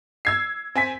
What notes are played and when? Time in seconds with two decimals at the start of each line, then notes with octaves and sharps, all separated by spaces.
0.25 E6 G#6 C7
0.75 C4 G#5 B6